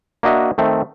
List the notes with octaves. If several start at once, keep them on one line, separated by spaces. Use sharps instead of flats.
A#3 D4 F#4 D#5 E5
D#3 A3 C4